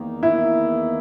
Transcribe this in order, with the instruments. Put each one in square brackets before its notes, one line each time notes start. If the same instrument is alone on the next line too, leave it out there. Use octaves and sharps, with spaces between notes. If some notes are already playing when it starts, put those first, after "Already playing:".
Already playing: [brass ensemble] E2 D#3 A#3
[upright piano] E4